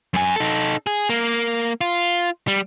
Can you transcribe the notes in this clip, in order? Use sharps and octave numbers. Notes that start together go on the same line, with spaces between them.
F#2 G#5
D#4 A4
G#4
A#3
F4
G3